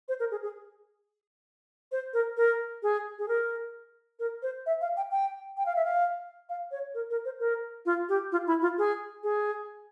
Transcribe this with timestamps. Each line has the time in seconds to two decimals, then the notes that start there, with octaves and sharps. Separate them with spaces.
0.08 C5
0.20 A#4
0.31 G#4
0.43 G#4
1.92 C5
2.14 A#4
2.37 A#4
2.83 G#4
3.19 G#4
3.28 A#4
4.19 A#4
4.43 C5
4.66 E5
4.81 F5
4.97 G5
5.11 G5
5.57 G5
5.66 F5
5.76 E5
5.85 F5
6.49 F5
6.71 C#5
6.94 A#4
7.10 A#4
7.25 C5
7.40 A#4
7.86 F4
8.09 G4
8.32 F4
8.47 E4
8.62 F4
8.78 G#4
9.23 G#4